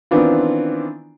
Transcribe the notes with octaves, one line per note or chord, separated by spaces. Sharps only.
D#3 E3 B3 C4 D4 F4